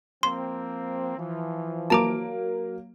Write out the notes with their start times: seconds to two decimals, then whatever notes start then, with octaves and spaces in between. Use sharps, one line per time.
0.23 F3 A#3 C4 C6
1.17 E3 F3
1.90 F#3 A#3 A5 A#5 D6 D7